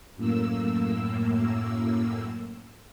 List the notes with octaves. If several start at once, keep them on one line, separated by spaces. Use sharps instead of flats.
F#2 A2 A#3 E6